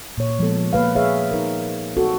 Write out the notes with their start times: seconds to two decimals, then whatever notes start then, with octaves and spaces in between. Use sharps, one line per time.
0.18 A#2 C#5
0.39 F3 G#3 B3 A4
0.73 A#3 B4 F5
0.95 G#4 B4 C#5 E5 F5
1.32 D#4 A#4
1.96 C4 F#4 A4